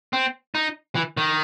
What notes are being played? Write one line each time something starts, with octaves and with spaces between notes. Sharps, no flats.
C4
D#4
E3
D#3